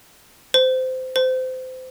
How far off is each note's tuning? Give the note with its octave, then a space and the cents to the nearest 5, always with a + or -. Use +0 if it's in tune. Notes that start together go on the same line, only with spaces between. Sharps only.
C5 -20
C5 -25